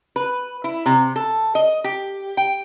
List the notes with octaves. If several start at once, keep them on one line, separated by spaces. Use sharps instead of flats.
B4
E4
C3
A4
D#5
G4
G5